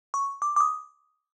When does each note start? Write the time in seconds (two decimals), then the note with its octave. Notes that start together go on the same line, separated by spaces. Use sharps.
0.14 C#6
0.42 D6
0.56 D6
0.60 D#6